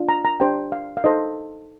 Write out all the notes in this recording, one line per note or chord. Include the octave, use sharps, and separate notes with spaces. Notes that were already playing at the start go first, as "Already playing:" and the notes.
Already playing: D4 F4
A#5
A#5
D4 G4 C5 G5
F5
F5
D#4 A4 C5 D#5